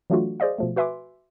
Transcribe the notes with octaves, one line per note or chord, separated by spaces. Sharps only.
E3 F#3 A3 D4 F4 F#4
G#4 C5 D5 D#5 F5
B2 F3 A3
F#4 B4 E5 G#5 C6 D6